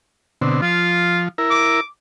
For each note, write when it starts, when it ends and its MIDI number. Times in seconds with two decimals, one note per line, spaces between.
0.42 0.61 47
0.42 0.61 50
0.42 0.61 60
0.62 1.28 53
0.62 1.22 65
1.38 1.80 64
1.38 1.80 70
1.50 1.83 86